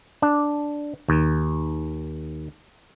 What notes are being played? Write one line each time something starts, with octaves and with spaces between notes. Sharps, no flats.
D4
D#2